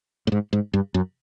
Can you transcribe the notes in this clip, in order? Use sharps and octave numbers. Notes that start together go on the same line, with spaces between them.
A2
G#2
G#2
G2
F#2